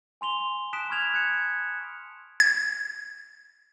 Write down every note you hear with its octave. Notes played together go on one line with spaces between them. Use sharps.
G#5 C6 F7 G7
A5 D#6 F#6 B6 D7 E7
B5 C#6 F6 G#6 F7
F#6 G#6 C#7 E7
G#6